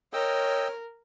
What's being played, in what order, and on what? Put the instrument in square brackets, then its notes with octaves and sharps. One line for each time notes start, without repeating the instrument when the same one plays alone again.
[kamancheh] A#4 [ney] C#5 [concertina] D#5 G5 E6